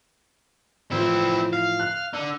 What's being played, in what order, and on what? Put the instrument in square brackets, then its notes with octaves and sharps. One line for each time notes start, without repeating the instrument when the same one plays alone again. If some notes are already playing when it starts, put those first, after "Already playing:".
[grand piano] A2 E3 F3 [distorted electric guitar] C4 E4
[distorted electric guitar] F5
[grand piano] F#6
[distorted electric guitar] D3